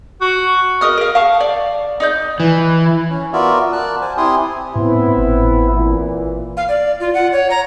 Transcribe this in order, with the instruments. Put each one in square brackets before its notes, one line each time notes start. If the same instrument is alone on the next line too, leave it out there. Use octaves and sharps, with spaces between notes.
[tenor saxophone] F#4
[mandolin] A#4 D#5 D#6 F6
A#4 F5
F5 A5 C#6
D5
D#4 D5 G6
[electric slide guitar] E3
[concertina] C#4
B3 F4 F#4 A#4 D5 E5
A#4 D5 A5 F#6
C5 G#5 A5
C4 E4 G4 G#5 C6 D#6
[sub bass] A2 [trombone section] B3 C4 E4
[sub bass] G#1
[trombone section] A#2 E3
[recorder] F5
D5
F4
F#5
C#5
A#5